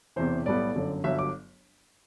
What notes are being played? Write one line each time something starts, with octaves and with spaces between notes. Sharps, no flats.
E1 E2 C3 E3 C5
B1 A2 G3 B3 D5
G1 F#2 D3
G1 G2 F#3 E5
D6